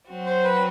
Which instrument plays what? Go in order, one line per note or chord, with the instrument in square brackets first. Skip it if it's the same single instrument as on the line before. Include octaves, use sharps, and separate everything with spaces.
[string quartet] F#3 C4 F#4
[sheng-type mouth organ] C5
B4